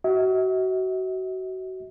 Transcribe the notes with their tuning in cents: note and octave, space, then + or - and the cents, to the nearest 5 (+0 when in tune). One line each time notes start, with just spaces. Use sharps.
F#4 +25 E5 -45